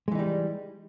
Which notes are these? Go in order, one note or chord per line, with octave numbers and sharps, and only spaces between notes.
E3 G3 G#3 D#4